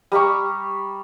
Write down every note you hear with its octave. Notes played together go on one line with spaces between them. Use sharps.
G3 A#5 B5 C#6